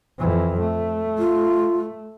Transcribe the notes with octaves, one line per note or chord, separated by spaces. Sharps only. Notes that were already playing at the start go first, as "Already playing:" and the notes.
F2 E3
A3
F4